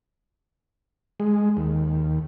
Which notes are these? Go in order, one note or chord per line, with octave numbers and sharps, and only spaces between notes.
G#3
D#2